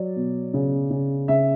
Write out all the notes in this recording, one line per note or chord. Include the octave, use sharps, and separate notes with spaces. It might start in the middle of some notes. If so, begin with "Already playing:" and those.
Already playing: F#3 D5
B2
C#3
C#3
C#3 E5